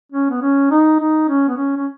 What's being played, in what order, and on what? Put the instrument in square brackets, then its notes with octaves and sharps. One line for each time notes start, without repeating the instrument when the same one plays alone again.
[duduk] C#4
B3
C#4
D#4
D#4
C#4
B3
C#4
C#4